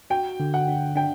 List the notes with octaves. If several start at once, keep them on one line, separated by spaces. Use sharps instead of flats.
F#4 G5
D3
F#5
D4
D4 G5